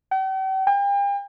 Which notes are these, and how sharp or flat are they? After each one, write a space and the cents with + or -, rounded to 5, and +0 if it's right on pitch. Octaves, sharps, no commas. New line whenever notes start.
G5 -45
G5 +40